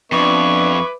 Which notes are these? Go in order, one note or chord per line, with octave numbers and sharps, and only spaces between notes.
F2 B3 D4 B4 E5 C#6 D6